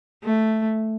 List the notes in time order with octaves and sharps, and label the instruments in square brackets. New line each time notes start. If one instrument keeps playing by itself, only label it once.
[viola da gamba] A3